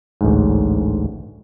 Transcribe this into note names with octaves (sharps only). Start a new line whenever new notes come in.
A1 D2 G#2